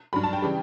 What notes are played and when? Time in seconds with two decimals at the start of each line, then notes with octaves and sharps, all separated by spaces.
0.13 G2 F#3 B5
0.24 A5
0.33 G5
0.42 C#3 E3 G3